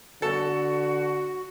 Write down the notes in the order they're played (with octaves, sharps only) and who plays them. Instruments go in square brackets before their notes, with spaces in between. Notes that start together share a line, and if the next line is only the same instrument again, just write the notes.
[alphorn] D3 [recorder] F#4 [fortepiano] A4